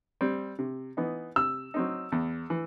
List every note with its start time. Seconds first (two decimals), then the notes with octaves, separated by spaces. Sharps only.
0.21 G3 C4
0.59 C3
0.97 E3 B3 D#4
1.36 C3 E6
1.74 F#3 C4 D#4
2.12 E2
2.50 E3